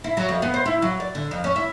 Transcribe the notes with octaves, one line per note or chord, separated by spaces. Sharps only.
E4
F#3
F2
B3
C5
E4
F#3
D5
D3
F2
C#4
E4